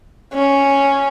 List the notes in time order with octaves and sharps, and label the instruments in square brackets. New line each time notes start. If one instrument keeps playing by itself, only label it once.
[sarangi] C#4